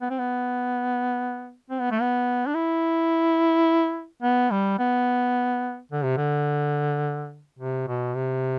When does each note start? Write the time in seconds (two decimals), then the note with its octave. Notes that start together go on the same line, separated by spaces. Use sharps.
0.02 B3
0.10 C4
0.19 B3
1.70 C4
1.81 B3
1.91 A3
2.01 B3
2.47 D4
2.55 E4
4.22 B3
4.51 G3
4.79 B3
5.92 D3
6.04 C3
6.18 D3
7.59 C3
7.88 B2
8.16 C3